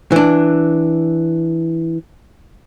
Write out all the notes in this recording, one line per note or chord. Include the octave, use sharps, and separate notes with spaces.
E3 D4